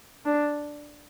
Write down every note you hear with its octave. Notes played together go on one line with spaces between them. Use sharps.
D4